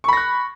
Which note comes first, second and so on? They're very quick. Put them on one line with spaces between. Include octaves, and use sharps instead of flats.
C#6 B5 A#6 F#6